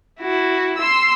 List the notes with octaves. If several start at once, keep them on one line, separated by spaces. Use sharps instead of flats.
E4 F#4
C6 E6